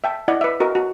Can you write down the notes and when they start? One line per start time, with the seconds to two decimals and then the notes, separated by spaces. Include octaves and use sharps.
0.04 E5 G5 A5
0.28 E4 D5 D#5 F#5
0.41 B4 E5
0.60 F#4 A#4 D#5
0.75 F#4